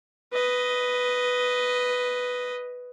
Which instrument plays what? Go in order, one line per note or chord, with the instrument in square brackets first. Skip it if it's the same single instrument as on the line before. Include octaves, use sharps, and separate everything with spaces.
[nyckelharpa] B4 D#5